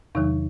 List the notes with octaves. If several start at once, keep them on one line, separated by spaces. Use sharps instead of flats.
E2 C3 D#3 F#3 D#4